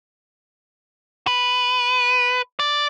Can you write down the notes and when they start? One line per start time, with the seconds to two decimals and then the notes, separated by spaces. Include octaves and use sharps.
1.27 B4
2.59 D5